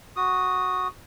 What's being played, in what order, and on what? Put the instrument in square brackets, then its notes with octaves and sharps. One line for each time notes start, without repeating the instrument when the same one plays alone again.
[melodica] F#4 D#6